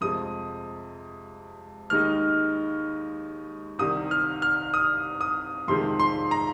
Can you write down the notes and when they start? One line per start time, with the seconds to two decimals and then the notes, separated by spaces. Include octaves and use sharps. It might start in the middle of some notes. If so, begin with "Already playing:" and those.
0.01 F2 C3 G#3 D#6
1.90 D#2 D#3 G#3 D#4 F6
3.79 C2 C3 D#3 D#6
4.11 F6
4.42 F6
4.74 D#6
5.21 D#6
5.68 F2 C3 D#3 G#3 C6
5.99 C6
6.31 A#5